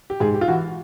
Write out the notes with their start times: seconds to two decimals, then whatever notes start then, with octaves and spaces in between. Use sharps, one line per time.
0.10 G4
0.20 G#2 G#4
0.34 G4
0.41 F4
0.48 E3 F#4